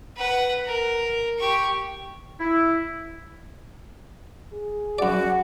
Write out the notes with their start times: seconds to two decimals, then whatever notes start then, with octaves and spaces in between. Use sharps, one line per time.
0.17 B4 F#5
0.65 A#4
1.39 G4 C#6
2.39 E4
4.53 G#4
4.99 F#2 F#4 D5